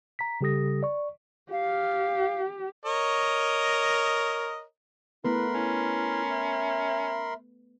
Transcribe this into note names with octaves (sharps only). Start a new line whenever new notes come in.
A#5 B6
C#3 G3 G4 A4 D#6 A#6
D5 C#6
G4 F5
A#4 C#5 D#5
A3 B3 E4 A#4 B4 B5 C6
C#4 E4
E5